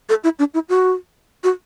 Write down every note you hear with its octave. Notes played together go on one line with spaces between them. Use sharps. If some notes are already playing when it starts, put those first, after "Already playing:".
A4
E4
D4
E4
F#4
F#4